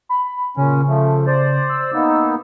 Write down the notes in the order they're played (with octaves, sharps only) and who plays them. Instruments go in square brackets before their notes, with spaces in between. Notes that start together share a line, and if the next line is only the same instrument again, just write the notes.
[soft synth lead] B5
[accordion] A#2 C#4 [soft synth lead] C#3
[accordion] F3 A3
C5 D5
[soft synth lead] E6
[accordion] A#3 B3 D#4